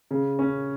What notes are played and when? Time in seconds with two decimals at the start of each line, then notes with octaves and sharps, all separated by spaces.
0.11 C#3
0.39 C#4